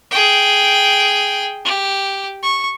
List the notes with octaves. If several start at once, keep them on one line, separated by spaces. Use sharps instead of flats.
G#4 G5
G4
C#6